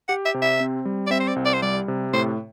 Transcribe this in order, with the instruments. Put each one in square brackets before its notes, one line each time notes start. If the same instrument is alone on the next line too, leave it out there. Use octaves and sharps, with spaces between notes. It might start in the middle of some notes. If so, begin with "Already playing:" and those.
[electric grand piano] G4 [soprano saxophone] F#5
[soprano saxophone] E5
[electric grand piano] C3
[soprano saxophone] E5
[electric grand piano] C4
G3
[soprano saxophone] D5
[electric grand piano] C4 [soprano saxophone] E5
[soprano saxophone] C5
D5
[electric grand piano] C2
[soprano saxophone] D5
C5
[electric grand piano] G3 [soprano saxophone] D5
[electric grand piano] C3
[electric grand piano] A2 [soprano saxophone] C5